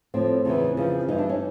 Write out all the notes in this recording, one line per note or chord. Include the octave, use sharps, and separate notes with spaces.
A2 F3 C4
E2 C#3 E3
F2 C#3 F3
G2 E3 D#4
D4
C#4